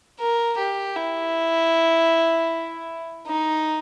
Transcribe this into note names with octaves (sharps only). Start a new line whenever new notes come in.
A#4
G4
E4
D#4